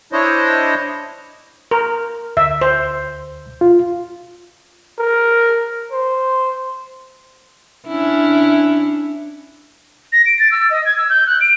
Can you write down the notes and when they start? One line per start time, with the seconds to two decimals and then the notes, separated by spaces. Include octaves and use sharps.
0.12 D4 E4 C5 C#5 D#5
1.71 A#4
2.37 D2 E5
2.61 C5
3.61 F4
4.98 A#4
5.92 C5
7.87 C#4 D4 E4
10.13 A#6
10.26 D7
10.39 A6
10.52 E6
10.71 D#5
10.85 G#6
10.97 E6
11.10 G6
11.27 F#6
11.41 D7